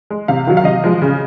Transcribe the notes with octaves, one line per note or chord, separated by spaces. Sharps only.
G#3
C3 F5
D#3 F#3
F5
C3 D#5
F3 G#3
C#3